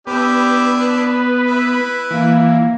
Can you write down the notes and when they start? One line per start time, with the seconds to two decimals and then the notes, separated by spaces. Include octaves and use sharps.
0.07 B3 D4 E4 G4
0.79 B4
1.45 E4
2.11 E3 A#3